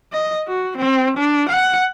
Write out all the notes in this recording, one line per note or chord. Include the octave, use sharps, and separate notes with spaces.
D#5
F#4
C4
D4
F#5